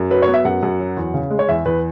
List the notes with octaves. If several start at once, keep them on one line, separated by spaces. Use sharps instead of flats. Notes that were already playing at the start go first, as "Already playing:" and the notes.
Already playing: F#2
F#3 B4
C#5
B3
E5
F#2 F#5
F#2
F#3
E2
C#3
G#3
C#5
E2 E5
E2 B4